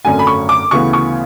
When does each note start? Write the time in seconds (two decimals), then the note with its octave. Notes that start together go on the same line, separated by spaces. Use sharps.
0.05 G#1 F#2 D3 A3 C#4 G#5
0.19 B5
0.27 C#6
0.49 D6
0.71 D2 C#3 E3 B3 C#6
0.93 C#6